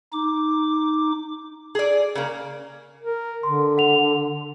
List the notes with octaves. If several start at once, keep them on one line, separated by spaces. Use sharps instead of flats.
D#4 D6
G#4 D5
C#3 A#3
A#4
D3 C6
F#5 F7